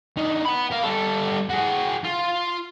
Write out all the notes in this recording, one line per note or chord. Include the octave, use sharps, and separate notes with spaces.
D3 D#4
F#5 B5
A#4 F5
G3 A4
F#4 G#4
F4